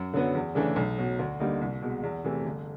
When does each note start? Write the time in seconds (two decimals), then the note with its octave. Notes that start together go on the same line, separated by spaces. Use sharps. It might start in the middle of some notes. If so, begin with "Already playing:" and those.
Already playing: F#2
0.13 D3 F#3 B3
0.35 E2
0.55 C#3 E3 A3 D4
0.76 B1
0.98 B2 F#3
1.19 D2
1.39 D3 G3 A#3 D#4
1.61 C2
1.82 B2 G#3
2.03 E2
2.24 C3 E3 A3
2.44 G1